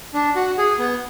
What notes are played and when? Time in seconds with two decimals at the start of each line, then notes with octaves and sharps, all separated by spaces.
0.14 D4
0.36 F#4
0.58 G#4
0.79 B3